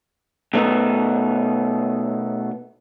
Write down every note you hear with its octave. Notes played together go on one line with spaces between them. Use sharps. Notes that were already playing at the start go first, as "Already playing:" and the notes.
B2 A3 B3 D#4